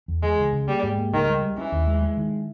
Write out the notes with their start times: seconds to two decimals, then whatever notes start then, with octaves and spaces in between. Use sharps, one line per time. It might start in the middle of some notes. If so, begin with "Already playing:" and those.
0.08 E2
0.22 E3 G#3
0.38 C#2
0.53 C#3
0.68 G3 A#3
0.83 G#2
0.98 A#3
1.13 C#2 D#3
1.28 G3
1.43 G3
1.57 E3 C#4
1.72 D#2
1.87 G#3
2.02 G#3
2.17 D#3